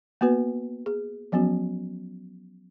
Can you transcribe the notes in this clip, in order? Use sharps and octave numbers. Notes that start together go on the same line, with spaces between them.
A#3 B3 F#4 B4
G#4
F3 F#3 B3 C#4 F#4